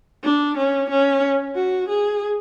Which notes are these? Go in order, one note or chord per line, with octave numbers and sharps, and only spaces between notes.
D4
C#4
C#4
F#4
G#4